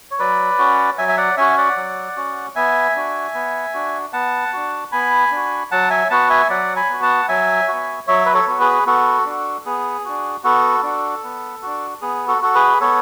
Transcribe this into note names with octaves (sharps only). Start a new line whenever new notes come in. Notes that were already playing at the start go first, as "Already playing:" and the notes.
C#5
F#3 B4 D5
C#4 F#4
F#3 E5 G#5
E5
D5 F#5
C#4 F#4 E5 G#5
D5 F#5
F#3
C#4 F#4
B3 E5 G#5
D4 F#4
B3
D4 F#4
B3 F#5 A5
D4 F#4
B3 G#5 B5
D4 F#4
F#3 F#5 A5
E5 G#5
B3 F#4 F#5 A5
E5 G#5
F#3 D5 F#5
G#5 B5
B3 F#4
F#5 A5
F#3 E5 G#5
B3 F#4
F#3 C#5 E5
B4
A4 C#5
B3 F#4
G#4 B4
B3 F#4 A4
D4 F#4
B3 G#4
D4 F#4
B3 F#4 A4
D4 F#4
B3
D4 F#4
B3 G#4
F#4 A4
F#4 A4
G#4 B4
B3 A4 C#5